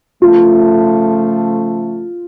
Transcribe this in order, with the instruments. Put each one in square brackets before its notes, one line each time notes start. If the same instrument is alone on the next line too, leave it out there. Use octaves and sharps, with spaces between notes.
[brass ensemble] C#3 F3 A3 [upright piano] F4